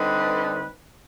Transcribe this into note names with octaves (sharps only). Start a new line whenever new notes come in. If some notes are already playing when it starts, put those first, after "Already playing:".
Already playing: D3 G3 C4 D#4 B4